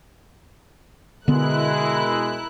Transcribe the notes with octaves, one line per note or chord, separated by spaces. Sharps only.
B2 D3 G#3 B3 E4 A#4 F#6